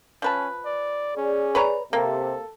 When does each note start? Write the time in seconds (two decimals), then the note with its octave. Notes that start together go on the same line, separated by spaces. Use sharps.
0.22 F3 C#4 B4 A5
0.66 D5
1.17 C#4 G#4 D5
1.55 B4 C#5 A#5
1.93 C3 A#3 A4